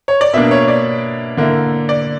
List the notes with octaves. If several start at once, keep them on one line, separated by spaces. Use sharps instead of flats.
C#5
D5
B2 A#3 D4 E5
C#5
D5
D3 A#3 E4
D5